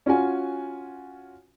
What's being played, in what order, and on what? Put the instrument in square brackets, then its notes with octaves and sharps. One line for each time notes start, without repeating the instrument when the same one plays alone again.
[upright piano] C#4 F4 F#4 G#5